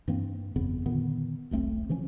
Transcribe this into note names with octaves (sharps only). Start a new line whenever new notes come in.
G2 E3 A#3 C4
G1 F2 C#3 B3
A#2 D3 D#3 B3
E1 B1 A3 C4
C#3 E3 F3 C#4